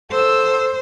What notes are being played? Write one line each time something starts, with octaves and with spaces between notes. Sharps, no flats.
A4 C5 E6